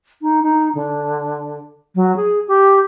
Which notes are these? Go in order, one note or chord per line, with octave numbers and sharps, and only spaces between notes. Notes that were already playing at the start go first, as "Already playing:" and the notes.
D#4
D#4
D3
F#3
G#4
G4